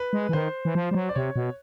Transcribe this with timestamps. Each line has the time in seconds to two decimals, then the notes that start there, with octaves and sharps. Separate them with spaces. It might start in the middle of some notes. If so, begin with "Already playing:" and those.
Already playing: B4
0.13 G#3
0.29 E3
0.33 D#3 C5
0.65 E3
0.75 F3
0.91 G3
0.95 F#3
1.09 D5
1.15 C3 C#5
1.36 B2